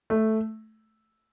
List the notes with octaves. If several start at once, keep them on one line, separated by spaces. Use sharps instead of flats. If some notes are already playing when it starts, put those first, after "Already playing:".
A3